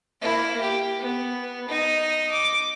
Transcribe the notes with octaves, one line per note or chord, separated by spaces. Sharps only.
A#3 E4
G4
B3
D#4 D#6
D6